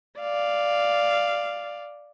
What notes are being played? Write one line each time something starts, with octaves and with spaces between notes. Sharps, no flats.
D5 F5